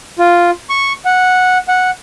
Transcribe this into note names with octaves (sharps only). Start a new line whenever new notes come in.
F4
C#6
F#5
F#5